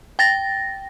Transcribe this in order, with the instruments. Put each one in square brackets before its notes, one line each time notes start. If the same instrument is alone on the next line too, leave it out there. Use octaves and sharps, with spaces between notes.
[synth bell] G5 A6 A#6